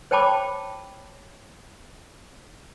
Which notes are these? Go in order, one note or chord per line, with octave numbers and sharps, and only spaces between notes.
C5 C#5 G5 A5 B5 D6